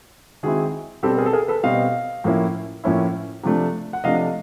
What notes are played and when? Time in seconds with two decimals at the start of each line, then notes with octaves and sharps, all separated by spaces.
0.43 D#3 G#3 C4 E4 F#4 G#4
1.03 B2 G3 C4 G4 A4
1.18 G#4 A#4
1.26 A4
1.33 G#4 A#4
1.48 A4 B4
1.63 B2 G3 C4 D#5 F5
2.24 A2 F3 A#3 C#4 E4
2.84 A2 F3 A#3 C#4 E4
3.43 C3 F3 A3 D4
3.93 F#5
4.04 C3 F3 A3 D4 D#5 F5